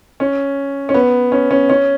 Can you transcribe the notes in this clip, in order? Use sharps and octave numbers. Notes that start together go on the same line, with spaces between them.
C#4
C#4
B3
C#4
C#4
C#4